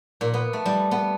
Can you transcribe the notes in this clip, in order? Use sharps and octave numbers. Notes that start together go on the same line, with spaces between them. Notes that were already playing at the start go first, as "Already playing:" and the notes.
A#2
B3
A3
G3
B3